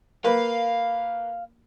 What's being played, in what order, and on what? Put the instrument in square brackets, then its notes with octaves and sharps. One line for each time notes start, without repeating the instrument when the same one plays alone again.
[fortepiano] A#3 B4 [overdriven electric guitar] F5